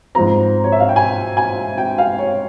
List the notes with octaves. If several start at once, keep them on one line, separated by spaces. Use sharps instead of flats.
G#2 F3 C4 A#5
C#5
E5
F5
G5
G#5
G#5
G5
F5
C#5